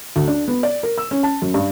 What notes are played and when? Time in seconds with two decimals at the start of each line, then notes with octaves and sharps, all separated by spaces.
0.16 D2
0.28 D4
0.48 B3
0.63 D5
0.83 A#4
0.98 E6
1.11 C#4
1.23 A5
1.42 F#2
1.54 G2